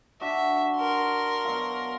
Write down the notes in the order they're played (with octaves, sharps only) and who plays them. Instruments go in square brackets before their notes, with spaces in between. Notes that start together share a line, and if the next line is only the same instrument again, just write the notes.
[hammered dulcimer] D4 F#4 [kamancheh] E5
[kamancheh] A#4 C6
[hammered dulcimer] B2 F#3 F5